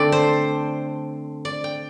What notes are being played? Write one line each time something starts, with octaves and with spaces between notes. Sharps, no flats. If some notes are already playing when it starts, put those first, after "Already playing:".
Already playing: D3 A3 C4 D5
C5
D5
G5